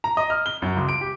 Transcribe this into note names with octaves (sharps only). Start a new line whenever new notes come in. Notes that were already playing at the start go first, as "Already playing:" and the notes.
A#5
D#5
F6
G7
F#2
C#2
D7
G4